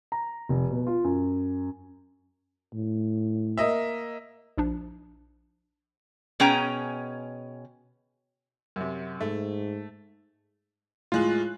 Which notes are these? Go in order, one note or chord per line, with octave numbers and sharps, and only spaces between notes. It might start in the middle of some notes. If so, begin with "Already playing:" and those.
A#5
F1
B2
F4
F#2
A2
A#3 D#5 E5
A#1 F3 D4
B2 C#4 G#4 G5 A#5
F#2 C3
G#2 A3
A2 G#3 F4 F#6